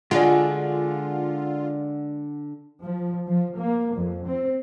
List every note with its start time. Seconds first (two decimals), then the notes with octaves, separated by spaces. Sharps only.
0.11 D3 G#3 F4 F#4 G#4 D5 F#5
2.81 F3
3.26 F3
3.56 A#3
3.93 F2
4.25 C4